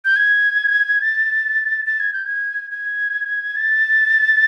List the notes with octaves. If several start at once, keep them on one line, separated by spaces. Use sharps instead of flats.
G6
G#6
A6
A6
G#6
G6
G#6
G#6
A6